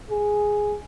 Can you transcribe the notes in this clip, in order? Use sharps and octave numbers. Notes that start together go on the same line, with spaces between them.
G#4